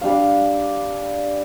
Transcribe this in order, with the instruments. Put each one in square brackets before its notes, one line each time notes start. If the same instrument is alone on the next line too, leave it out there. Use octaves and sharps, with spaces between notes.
[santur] G3 D4 F5